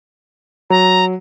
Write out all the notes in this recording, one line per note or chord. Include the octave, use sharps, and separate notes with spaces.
F#3 A#5